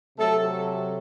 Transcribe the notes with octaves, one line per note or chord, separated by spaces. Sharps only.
C3 F#3 A3 A4